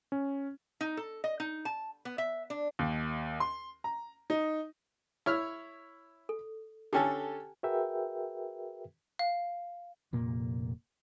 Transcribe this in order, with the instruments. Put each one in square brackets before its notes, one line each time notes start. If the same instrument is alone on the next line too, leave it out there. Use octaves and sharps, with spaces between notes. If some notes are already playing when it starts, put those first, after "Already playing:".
[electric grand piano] C#4
[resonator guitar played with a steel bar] D#4
A4
D#5
D#4
A5
B3
E5
D4
[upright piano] D#2
C6
A#5
D#4
[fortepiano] E4 C#5 F6
[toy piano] A4
[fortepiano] D3 C#4 A4 [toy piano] G4 G5 G#5
[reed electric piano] F#4 G#4 A#4 B4 E5 G5
[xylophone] F5
[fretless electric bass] F1 A#2 A#3